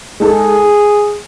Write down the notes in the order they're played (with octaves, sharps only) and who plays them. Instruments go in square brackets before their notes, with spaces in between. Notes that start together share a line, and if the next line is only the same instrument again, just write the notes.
[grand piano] G#3 D#4 A4 [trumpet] G#4